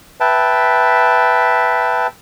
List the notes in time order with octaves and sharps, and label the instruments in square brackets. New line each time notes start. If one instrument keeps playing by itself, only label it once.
[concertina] B4 E5 G5 A5